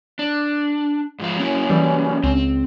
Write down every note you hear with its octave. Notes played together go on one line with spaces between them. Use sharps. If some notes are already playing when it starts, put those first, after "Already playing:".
D4
G#2 F3 F5
F#3 A#3 C#4 E4
E3 G3
C#2 C4